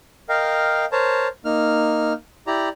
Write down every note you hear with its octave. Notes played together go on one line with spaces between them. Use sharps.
A#4 D#5 F5 G5
A#4 C5 C#5 A5
A#3 D#4 F6
E4 G4 D5 A#5